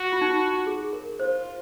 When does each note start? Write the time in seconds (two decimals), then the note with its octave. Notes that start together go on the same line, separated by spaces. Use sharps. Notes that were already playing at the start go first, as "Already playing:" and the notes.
Already playing: F#4
0.13 F4
0.21 D#4
0.30 F4
0.67 G#4
0.93 A#4
1.20 F4 C5